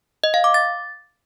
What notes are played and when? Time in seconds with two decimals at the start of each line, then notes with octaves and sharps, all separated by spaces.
0.24 D#5
0.34 F5
0.44 D6
0.54 A6